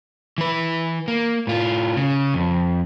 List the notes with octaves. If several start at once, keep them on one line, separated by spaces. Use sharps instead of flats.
E3 B4
A#3
A2 F4
C#3
F2